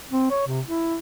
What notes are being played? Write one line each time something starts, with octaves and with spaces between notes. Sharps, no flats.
C4
C#5
C3
E4